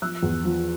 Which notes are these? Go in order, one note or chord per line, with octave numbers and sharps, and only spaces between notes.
F3 E6 F#6
E2
F3